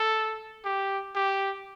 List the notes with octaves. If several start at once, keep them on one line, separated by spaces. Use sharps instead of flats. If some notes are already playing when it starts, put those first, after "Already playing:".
Already playing: A4
G4
G4